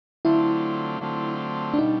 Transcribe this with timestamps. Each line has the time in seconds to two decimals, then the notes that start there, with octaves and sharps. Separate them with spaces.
0.25 D3 F#3 A3 C4 E4 F4
1.01 D3 F#3 A3 C4 F4
1.74 D4
1.78 B2 G3 D#4